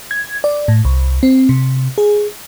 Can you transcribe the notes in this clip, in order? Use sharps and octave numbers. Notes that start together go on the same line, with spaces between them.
G#6
D5
A2
C2
C4
C3
G#4